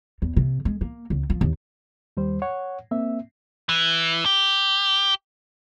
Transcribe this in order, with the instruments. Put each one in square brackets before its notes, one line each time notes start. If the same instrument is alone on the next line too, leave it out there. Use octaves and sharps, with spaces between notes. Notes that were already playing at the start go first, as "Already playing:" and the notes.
[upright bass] E2
C3
G#3
A#3
C#2
F3
D#2
[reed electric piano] D#2 G3 C5
C#5 F#5
A#3 C4 E5
[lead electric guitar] E3
G4